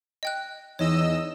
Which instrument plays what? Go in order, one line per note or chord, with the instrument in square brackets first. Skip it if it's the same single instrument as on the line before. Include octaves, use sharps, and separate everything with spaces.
[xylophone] D#5 G5 F#6
[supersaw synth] E2 D#5 E6 [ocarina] D#4 [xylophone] C#5